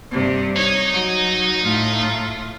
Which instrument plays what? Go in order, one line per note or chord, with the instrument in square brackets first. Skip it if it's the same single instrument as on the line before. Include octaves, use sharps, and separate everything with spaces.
[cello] G2 C3
[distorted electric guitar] D#4 [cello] C#5
[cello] F#3
A2 F4